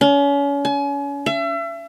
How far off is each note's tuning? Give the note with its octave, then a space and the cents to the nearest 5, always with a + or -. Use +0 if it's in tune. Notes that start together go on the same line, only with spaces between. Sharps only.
C#4 +35
G#5 +35
E5 +35